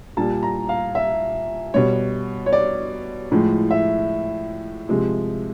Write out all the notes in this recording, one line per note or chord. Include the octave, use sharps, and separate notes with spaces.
A#2 G3 A5
A#5
F5
E5
B2 G3 C#5
C#5
D5
A2 F3 G#3
E5
C3 F3 G#3